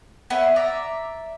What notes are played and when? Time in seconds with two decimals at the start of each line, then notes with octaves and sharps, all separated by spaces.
0.30 B3 C#4 E4 B4
0.56 D5 E5 A#5